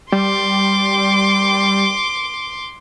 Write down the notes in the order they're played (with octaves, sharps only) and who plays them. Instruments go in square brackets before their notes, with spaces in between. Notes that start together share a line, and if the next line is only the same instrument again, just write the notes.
[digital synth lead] G3 [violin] C6 D6